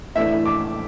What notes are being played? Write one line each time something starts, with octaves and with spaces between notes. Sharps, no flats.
A2 E3 A3 D4 E5
D6